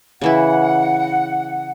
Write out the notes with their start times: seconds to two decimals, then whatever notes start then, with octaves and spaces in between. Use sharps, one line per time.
0.21 C#3 E3 E4 F#5